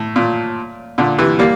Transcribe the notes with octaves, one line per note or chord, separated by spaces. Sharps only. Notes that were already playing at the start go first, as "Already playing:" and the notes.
Already playing: A2
A#2
A#2 D3
C3 E3
G3 A#3